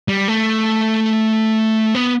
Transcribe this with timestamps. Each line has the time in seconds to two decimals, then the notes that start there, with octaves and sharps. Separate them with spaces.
0.08 G3
0.28 A3
1.95 B3